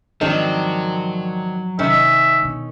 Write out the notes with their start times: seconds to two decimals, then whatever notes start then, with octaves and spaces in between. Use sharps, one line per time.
0.21 G#2 D#3 F3 F#3 C4 D4
1.79 C3 D#3 C#4 E5
2.42 B2 D3